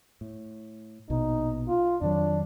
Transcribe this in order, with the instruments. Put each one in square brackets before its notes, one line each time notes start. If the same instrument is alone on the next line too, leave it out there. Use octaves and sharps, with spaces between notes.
[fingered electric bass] A2
[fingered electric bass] A#1 B2 [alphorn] D#4
[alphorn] F4
[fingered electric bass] F2 D#3 F#3 [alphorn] D4